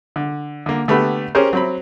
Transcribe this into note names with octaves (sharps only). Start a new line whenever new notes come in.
D3
D3 A#3
D3 A3 B3 G4 B5
C#4 G4 G#4 A#4 C5
F#3 C4 B5